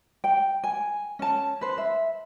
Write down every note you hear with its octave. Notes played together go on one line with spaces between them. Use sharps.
G5
G#5
C#4 A5
B4 C5
E5